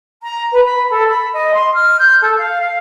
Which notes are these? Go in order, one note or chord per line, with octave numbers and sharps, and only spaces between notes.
A#5
B4
B5
A4
B5
D#5
C6
F6
G6
A4
F5
F5